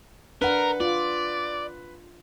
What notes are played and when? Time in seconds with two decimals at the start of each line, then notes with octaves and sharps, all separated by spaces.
0.42 D4 A#4 B4 F#5
0.80 F4 D5